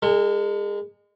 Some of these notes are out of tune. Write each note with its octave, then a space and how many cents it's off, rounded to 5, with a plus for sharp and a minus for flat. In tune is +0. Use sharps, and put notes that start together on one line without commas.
G#3 -30 A4 +35